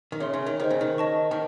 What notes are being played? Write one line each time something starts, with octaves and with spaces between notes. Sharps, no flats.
D#3
C#3 C#5 E5 C6
C#3
D#3
D#3 G#4 C5 D#5
C#3
D#3
D#5 A5 C#6
D#3